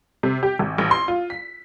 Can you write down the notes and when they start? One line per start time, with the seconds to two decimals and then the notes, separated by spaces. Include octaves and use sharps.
0.23 C3
0.43 G4
0.59 G#1
0.78 A1
0.91 C6
1.08 F4
1.30 B6